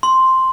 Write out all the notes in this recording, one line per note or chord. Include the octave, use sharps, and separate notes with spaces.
C6